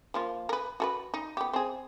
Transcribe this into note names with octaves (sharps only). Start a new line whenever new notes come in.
F3 A#3 F4
A#4 B4
F#4 A4 B4
D#4
B3 G4
C4 G#4